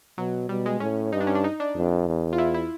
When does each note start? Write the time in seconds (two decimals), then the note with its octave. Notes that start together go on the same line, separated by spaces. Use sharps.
0.18 B2 F#3
0.49 B2 G3
0.66 G#3
0.80 A2 C#4
1.12 G2 D#4
1.21 D4
1.27 C#4
1.35 D4
1.44 D#4
1.60 D4
1.76 F2
2.07 E2
2.33 F4
2.38 E4
2.54 E4